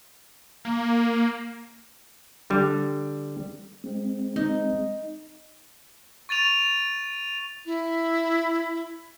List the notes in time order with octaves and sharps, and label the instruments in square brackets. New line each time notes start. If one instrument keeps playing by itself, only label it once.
[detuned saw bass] A#3
[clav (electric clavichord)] D3 G3
[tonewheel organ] G#3 C4
[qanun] D#4
[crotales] C#6 A6 D#7 F7
[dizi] E4